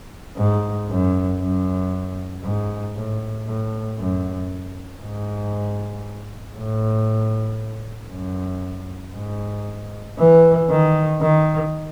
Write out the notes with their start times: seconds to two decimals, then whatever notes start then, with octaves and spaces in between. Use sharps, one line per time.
0.37 G#2
0.89 F#2
1.41 F#2
2.43 G#2
2.96 A2
3.47 A2
3.99 F#2
5.01 G#2
6.57 A2
8.11 F#2
9.15 G#2
10.18 E3
10.70 D#3
11.21 D#3